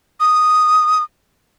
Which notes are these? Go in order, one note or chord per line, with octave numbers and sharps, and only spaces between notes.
D#6